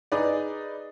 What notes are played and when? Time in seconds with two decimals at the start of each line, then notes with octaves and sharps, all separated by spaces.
0.12 D#4 G#4 B4 D5